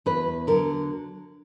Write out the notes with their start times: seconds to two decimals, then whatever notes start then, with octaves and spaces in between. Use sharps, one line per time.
0.06 E2 B4
0.47 D3 F#3 A#4